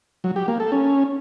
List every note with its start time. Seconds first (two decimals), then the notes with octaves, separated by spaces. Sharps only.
0.24 F#3
0.36 G4
0.48 A#3
0.60 A4
0.72 C#4